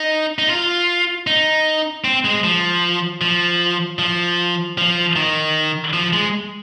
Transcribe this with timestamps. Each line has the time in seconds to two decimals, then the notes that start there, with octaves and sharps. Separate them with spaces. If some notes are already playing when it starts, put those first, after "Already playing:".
Already playing: D#4
0.39 D#4
0.49 F4
1.27 D#4
2.04 C4
2.25 G#3
2.44 F3
3.21 F3
3.99 F3
4.78 F3
5.16 D#3
5.94 F3
6.13 G#3